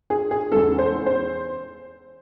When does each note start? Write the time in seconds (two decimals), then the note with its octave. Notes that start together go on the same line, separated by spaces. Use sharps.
0.10 G#4
0.31 G#4
0.52 E2 C#3 G#3 A4
0.78 C5
1.06 C5